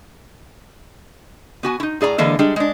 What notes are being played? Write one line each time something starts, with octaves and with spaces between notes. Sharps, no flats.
B3 F#4 G#5
D#4 E4
A2 G#4 D5 A#5
D3 E3 G#3 A#3 D4
G3 G#3 D4
G#3 D4